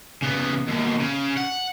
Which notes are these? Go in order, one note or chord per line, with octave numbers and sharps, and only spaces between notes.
C#3 B3
D#2 B2
C#3
F#5